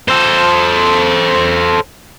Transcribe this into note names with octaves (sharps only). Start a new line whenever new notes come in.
A4 C5